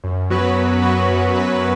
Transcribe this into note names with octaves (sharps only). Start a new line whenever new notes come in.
F#2
F#3 B3 F#4 B4
F#2
F#3 B3 F#4 B4
F#2
F#3 B3 F#4 B4